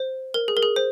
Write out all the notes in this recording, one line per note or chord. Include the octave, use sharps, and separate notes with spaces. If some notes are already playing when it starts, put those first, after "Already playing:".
Already playing: C5
A#4
G#4
A#4
G#4
C5